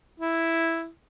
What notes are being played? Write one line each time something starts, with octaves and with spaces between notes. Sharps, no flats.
E4